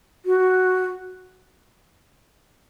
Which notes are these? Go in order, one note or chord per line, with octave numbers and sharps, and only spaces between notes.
F#4